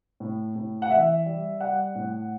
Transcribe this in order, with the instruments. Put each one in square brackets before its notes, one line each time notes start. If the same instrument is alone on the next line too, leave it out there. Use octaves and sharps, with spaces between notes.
[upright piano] A2
A2
F#5
E3 E5
G3
G3 F#5
A2